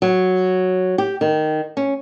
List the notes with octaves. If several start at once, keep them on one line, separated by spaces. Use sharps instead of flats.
F#3
G4
D#3
C#4